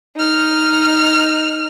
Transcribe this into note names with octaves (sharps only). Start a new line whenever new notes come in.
D#4 F6